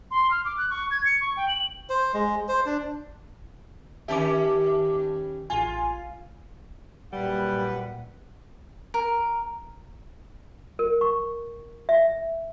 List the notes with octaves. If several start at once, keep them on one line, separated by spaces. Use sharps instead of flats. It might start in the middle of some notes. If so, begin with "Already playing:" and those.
C6
F6
D6
F#6
C#6
G#6
C#7
C#6
G5
F#7
C5
G#3
C5
D4
D#3 C#4 G4 E5 A5 D6
A1 F4 G#5
F#2 A#2 G3 B4 F#5
A#4
A#4
C#6
E5